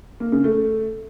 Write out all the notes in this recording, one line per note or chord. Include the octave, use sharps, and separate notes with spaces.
A#3
C#3
A3